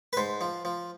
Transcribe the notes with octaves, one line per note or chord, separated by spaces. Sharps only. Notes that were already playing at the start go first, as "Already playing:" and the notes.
B4
G#2 C5
F3
F3